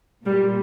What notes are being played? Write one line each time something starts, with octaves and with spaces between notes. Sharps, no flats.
A#2 G3